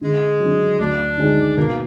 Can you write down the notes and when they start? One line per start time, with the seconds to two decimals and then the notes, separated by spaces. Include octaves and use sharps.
0.01 D3 G#3
0.40 F#3
0.45 D4
0.79 D2 D4
1.18 D3 G#3 D#4
1.57 B2 A#3